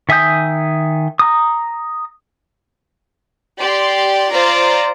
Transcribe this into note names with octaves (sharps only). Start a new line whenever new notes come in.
D#3 E5 G#5 D#6 G6
A#5 D#6
G4 D5 C6
F4 C5 D5 A#5